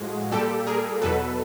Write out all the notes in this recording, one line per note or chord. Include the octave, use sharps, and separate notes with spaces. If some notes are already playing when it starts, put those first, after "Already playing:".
Already playing: A2 F3 G#3 F#4 G#4
A#2 G3 G4 A4
G#4 A#4
E2 B2 F#3 A4 B4